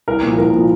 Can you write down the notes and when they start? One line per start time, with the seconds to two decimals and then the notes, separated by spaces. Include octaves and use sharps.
0.08 C2 A#4
0.23 A#2 F3
0.38 C2 A#4
0.53 A#2 F3